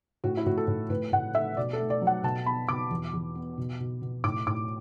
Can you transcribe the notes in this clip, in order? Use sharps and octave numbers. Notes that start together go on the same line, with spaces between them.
A2 F#4
E4
A2 F#4
A4
A2
A2 B4
A2 F#5
A3 E5
B2 D5
A4
A3
D5
F#3
F#5
B2 A5
B3 B5
B2 D6
E2
E2
B3
B2
B2
B2
A2 D6
A2 D6